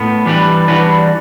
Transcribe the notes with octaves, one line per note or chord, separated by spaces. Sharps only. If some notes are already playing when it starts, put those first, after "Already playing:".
Already playing: A2 B3
E3 G3 D4 G4 B4
E3 G3 D4 F#4 B4